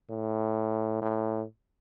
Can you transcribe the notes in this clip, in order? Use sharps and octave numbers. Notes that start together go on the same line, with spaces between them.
A2
A2